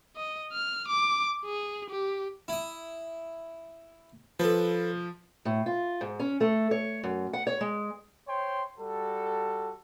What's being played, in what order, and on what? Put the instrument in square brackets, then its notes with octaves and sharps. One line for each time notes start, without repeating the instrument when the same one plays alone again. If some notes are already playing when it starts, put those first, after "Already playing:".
[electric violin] D#5
F6
D6
G#4
G4
[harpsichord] E4 D#6
[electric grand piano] F3 [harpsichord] A4 B4
[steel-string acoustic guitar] A2
F4
G#2
C#4
A3
C#5
F#2
F#5
C#5
G#3
[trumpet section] C5 C#5 G5 C6
G3 F#4 A4